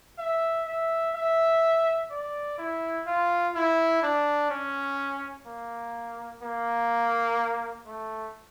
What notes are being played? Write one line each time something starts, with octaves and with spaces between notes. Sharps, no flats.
E5
E5
E5
D5
E4
F4
E4
D4
C#4
A#3
A#3
A3